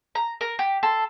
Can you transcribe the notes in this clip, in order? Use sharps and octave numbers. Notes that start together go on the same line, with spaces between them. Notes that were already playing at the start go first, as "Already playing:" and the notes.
A#5
A#4
G4
A4 C6